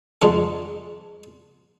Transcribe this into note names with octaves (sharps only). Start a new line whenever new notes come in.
F2 G#2 D3 G#3 A4